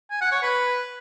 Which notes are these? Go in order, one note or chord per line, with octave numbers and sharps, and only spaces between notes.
G#5
F#5
C#5
B4